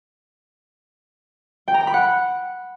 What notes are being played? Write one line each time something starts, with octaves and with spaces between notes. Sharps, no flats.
G5
A#5
G5
B5
F#5